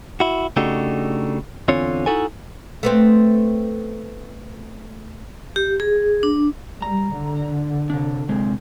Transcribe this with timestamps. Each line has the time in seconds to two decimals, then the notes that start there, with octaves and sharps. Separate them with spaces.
0.20 E4 F#4
0.57 C#3 A3 D4 D#4 F#4 G4
1.68 E2 D3 C4 C#4 F4 C#5
2.06 D#4 E4 F#4 A4 G#5
2.83 A3 B3 C4
5.56 G4
5.80 G#4
6.23 D4
6.82 G3 A#5
7.14 D3
7.90 C3 D4
8.29 C3 G#3 C4